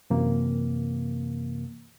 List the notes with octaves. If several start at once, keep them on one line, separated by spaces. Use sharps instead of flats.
F#2 C3 E3 A#3